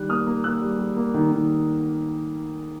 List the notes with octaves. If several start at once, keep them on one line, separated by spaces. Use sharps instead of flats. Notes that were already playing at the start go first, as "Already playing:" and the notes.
Already playing: D#3 G3 F#6
A#3 D#6 F6
A#3
A#3 E6 F#6
G3
G3
A#3
D#3
D#3